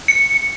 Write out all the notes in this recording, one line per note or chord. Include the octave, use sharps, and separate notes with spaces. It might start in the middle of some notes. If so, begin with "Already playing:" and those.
C#7